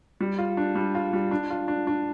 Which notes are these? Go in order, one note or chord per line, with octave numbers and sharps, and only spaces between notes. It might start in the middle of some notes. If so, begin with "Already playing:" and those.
G3
F4
D4
G3
F4
G3
D4
F4
D4
D4